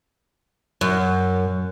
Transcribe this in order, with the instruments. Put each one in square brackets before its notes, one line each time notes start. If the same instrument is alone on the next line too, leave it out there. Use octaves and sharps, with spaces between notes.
[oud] F#2